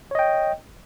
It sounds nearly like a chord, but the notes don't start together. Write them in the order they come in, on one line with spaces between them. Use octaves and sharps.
C#5 D#5 G5